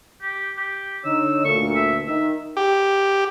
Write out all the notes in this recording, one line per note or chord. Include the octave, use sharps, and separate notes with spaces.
G4
G4
D3 D#4 C#5 E6
D2 A#2 A3 C#6
E5
D#3 E5
G4